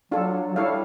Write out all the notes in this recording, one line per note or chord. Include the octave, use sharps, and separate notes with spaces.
F#3 D4 F4 A4
F#3
G3 E4 A4 C#5 F5